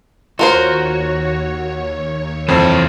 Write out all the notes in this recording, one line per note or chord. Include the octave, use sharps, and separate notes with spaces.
D#2 F4 F#4 A#4 C5 C#5
F2 E3 C4 C5